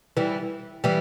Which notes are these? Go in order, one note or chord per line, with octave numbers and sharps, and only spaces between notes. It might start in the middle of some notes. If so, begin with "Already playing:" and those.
E3 G3
E3 G3